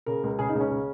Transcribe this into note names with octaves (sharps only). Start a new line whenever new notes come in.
C#3 A#4
C#2
C#3 G#4
D#4
C#2
C#4
C#3